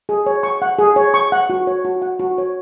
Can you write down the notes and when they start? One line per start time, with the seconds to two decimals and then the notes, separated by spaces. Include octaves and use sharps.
0.09 G#4
0.26 C#5
0.43 C#6
0.62 F#5
0.79 G#4
0.96 C#5
1.14 C#6
1.32 F#5
1.50 F#4
1.67 C#5
1.85 F#4
2.02 F#5
2.19 F#4
2.38 C#5